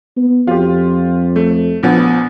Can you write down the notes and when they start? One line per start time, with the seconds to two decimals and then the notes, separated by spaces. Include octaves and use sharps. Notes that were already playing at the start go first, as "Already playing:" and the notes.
0.17 B3
0.47 F2 F4 G4
1.36 A3
1.83 A#1 F3 B3